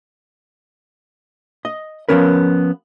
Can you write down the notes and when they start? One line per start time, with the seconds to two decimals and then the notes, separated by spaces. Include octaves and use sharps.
1.65 D#5
2.09 F3 A3 B3 C#4 A#4 B4